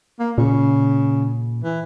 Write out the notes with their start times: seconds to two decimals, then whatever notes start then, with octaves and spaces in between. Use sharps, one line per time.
0.19 A#3
0.38 A#2 C#3
1.63 E3